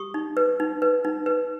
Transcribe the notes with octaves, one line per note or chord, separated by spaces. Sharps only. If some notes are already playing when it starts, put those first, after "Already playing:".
Already playing: G4 C#6 D#6
D#4
B4
D#4
B4
D#4
B4